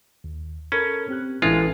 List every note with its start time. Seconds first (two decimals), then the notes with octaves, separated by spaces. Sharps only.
0.24 D#2
0.72 C#4 A4 A#4 B5
1.08 C4 G4 F#6
1.42 A1 E3 G#3 C#4 D4 F4 A4